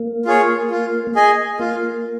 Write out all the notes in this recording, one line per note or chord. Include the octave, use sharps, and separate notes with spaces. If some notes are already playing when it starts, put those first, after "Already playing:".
Already playing: A#3
F4 G#4 C#5
F4
G#4 D#5 G#5
A#3 F4